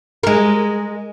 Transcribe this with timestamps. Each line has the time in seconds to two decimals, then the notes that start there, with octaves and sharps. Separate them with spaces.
0.23 G#3 A#4